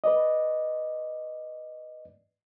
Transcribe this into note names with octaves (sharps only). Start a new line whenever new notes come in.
B4 D5 D#5